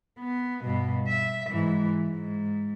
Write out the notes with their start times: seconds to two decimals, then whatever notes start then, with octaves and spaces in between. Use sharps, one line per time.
0.19 B3
0.65 G2 B2
1.08 E5
1.51 G#2 E3
2.10 G#2